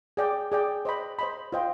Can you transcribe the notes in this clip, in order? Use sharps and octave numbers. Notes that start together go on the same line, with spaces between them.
G#4 D5 G5
G#4 D5 G5
C5 D#5 B5
C5 D#5 B5
F4 C5 D#5 G5